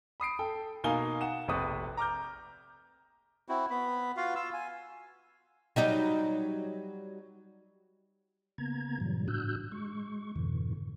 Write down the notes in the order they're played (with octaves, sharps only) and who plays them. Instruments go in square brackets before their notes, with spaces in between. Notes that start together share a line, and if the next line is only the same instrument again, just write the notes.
[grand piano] B5 D#6 C7 D7
A4 G5
B2 A#3 D#4 F5 G#5 G7
F#5 E7
F1 A#1 C3 B4 C#6 D#6
A#5 D6 F6 G6
[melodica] C4 E4 F#4
B3 B5
F4 F#4 F5
F4 F5 E6
G#5
[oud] F#3 G3 D#4
[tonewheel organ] C#3 A#3 B3 A#5 G#6
G2 A#2 C#3 E3 F#3 G3
A2 D4 F#4 E6 F#6 G6
G#3 C#6
F2 G#2 B2 D3 E3